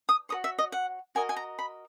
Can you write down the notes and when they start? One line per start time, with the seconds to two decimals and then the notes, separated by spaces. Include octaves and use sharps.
0.09 D#6
0.29 F#4 A#4 C#5 D#6
0.44 E5
0.58 D#5
0.72 F#5
1.15 F#4 A#4 D#5 G#5
1.29 G#5
1.37 A#5
1.59 B5